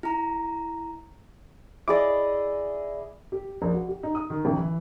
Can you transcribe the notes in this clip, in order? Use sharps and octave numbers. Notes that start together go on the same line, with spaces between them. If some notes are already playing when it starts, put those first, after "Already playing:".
E4 A#5
E4 G#4 D5 D#5 D6
G4
A#1
F#4
G4
D#4
D#6
D#3
A1
E3